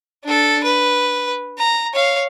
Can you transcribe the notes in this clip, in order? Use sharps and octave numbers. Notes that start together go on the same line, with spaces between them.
D4 A4
B4
A#5
C#5 F5